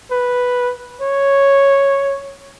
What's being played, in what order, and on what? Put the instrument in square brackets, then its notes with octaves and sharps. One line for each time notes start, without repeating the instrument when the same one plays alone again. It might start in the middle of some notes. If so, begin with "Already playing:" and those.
[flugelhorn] B4
C#5